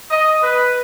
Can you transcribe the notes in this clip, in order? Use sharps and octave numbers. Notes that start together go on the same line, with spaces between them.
D#5
B4